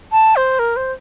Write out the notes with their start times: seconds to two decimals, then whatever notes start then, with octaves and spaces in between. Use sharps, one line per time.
0.12 A5
0.36 C5
0.59 A#4
0.76 C5